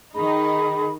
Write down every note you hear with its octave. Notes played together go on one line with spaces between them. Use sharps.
D#3 D#4 G#4 B5